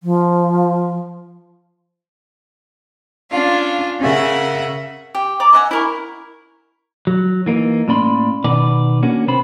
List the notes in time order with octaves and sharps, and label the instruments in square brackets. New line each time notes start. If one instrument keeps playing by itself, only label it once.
[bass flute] F3
[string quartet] C#4 D4 F4 F5
C#3 C#4 A#4 E5 F#5
[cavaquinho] G4
D5 A#5 D6
D#5 E5 F#5 G#5
E4 A#4 C#6
[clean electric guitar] F#3
E3 A#3 D#4
A2 A#3 C#4 D5 B5 C6
B2 D#3 B3 D5
A#3 C#4 D4 F#4
C3 B3 C5 B5